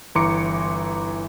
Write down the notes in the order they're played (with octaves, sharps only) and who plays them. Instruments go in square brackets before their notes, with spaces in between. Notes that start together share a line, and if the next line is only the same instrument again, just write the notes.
[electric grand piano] G1 E3 A#5 C6 D6 C#7